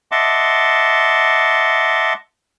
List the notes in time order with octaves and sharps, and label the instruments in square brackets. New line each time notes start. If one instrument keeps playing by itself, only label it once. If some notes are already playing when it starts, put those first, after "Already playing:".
[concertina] D#5 E5 F#5 A5 C6 D6